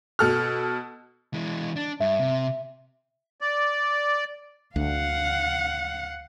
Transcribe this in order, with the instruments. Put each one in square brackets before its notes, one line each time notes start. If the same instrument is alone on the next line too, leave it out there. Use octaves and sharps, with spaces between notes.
[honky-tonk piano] B2 A4 F6
[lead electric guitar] E3 G#3
D4
[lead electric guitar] G2 [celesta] E5
[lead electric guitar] C3
[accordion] D5
[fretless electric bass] D2 [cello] F5 F#5